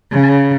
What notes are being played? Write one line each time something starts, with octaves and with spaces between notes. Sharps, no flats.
C#3